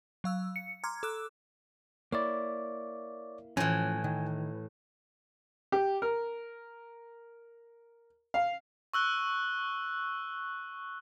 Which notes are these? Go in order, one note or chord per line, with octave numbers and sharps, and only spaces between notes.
F#3 F5 E6
C#7
A#5 C6 D6 F6 G#6
A4 D6 E6 F#6
A#3 E4 C#5 D5
A2 E3 F3 C#4 G#5
D#3
G4
A#4
F5
C#6 E6 F#6 G7